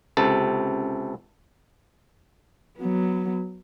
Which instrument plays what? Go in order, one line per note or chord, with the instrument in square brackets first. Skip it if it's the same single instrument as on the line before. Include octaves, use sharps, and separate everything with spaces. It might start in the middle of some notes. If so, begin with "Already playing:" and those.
[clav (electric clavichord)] C#2 C3 A4
[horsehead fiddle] F#3 B3